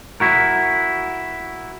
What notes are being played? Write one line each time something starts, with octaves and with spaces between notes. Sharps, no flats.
E4 F#4 A#4